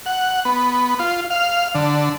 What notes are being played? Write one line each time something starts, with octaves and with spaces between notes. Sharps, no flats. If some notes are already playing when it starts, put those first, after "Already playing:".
F#5
B3
F4
F5
D3